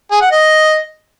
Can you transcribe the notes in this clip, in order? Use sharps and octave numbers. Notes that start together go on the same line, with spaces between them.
G#4
F#5
D#5